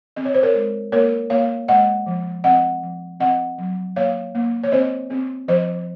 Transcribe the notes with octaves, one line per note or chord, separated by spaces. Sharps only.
C4 D#5
C#5
C5
A#4 C#5
G#3
A#3 A#4 C#5
A#3 C#5 F5
G#3 D#5 F#5
F3
C4 D#5 F#5
F3
C4 D#5 F#5
F#3
A#3 C#5 F5
A#3
C#5
C4 C5 D#5
C4
F3 C5 D#5